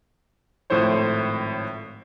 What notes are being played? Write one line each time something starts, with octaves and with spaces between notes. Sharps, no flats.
G#1 A2 F3 E4 C5 C#5